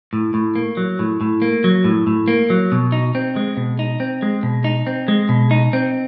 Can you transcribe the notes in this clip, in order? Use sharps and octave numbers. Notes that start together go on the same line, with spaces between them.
A2
A2
A#3
F#3
A2
A2
A#3
F#3
A2
A2
A#3
F#3
B2
D#4
C4
G#3
B2
D#4
C4
G#3
B2
D#4
C4
G#3
B2
D#4
C4